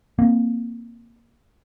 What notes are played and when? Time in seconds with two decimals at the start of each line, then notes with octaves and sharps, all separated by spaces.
0.19 A#3 C4